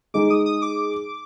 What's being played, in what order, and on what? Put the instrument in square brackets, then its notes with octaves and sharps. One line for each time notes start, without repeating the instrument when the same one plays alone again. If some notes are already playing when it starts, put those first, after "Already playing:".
[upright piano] G#3 D#4 G#4 [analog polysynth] D6
[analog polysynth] D#6
D#6
D6